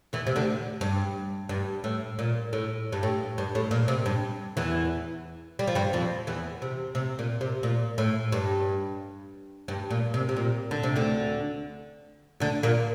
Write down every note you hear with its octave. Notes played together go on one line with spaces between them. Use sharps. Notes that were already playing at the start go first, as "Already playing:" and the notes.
E2 E3
C3
D2 D3
G2
G2
A2
A#2
A2
G2
A2
G2
A2
A#2
C3
G2
E2 E3
G3
F3
G2 G3
F2 F3
E2 E3
C3
C3
A#2
C3
A#2
A2
G2
G2
A#2
C3
C3
A#2
D3
C3
D2 D3
D2 D3
A#2 A#3